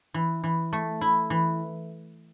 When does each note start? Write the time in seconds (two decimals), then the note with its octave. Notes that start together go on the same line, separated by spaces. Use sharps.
0.14 E3
0.44 E3
0.73 A3
1.01 E4
1.30 E3